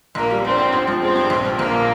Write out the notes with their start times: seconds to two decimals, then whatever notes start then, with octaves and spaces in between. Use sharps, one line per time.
0.15 A#1 A#3
0.30 G3
0.44 C4 D4
0.58 G#2
0.73 G1
0.87 F3
1.02 G#3 C4
1.16 G2
1.30 A#1
1.45 F3
1.59 A#1 A#3
1.74 A#2